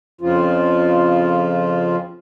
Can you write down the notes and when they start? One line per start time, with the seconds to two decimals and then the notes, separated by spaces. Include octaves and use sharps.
0.21 F2 C#3 F3 F4